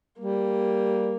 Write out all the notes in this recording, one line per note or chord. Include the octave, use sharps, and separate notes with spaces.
G3 A#3